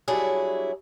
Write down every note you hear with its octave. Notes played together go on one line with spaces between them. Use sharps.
F#3 G3 D4 E4 G#4 C#5